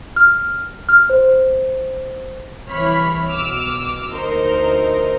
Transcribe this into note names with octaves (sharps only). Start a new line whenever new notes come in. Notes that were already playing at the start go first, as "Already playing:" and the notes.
F6
F6
C5
C2 E3 C#5 B5 F6 B6
B1 B2 D6 E6 F6
D2 D#4 A#4 C5